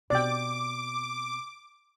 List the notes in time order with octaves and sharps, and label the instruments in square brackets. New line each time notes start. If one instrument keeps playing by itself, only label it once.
[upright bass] B2 C4 [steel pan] D5 G5 [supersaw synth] D6